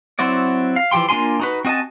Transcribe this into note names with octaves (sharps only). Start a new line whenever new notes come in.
F#3 C4 E4 F#4 D5
F5
E3 F3 G4 G5 C6
A#3 D4 F4 G#5 C6
D#4 F#4 B4
C4 F#4 D#5 G#5 A5